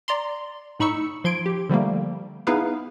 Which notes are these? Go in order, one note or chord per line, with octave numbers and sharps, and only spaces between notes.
D5 A#5 C6
A2 D#4 B5 C#6 E6 C#7
F3 C6 G#6 D7
G4
D3 F3 G3 A3 A#3
B3 D#4 E4 G#4 B4 F5